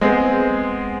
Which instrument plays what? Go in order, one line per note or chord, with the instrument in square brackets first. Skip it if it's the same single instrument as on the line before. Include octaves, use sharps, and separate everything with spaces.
[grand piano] G#3 B3 C4 G#4